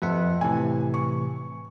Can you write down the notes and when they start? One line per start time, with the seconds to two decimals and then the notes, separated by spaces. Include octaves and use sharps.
0.02 F2 B4 E5 F#5
0.41 A2 C3 E3 G#5
0.94 C#6